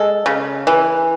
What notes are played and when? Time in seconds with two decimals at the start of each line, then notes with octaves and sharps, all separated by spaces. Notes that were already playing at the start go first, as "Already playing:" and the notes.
Already playing: G#3 A4
0.26 C#3
0.67 E3